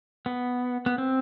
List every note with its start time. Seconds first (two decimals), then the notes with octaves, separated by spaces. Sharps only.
0.26 B3
0.86 B3
0.98 C4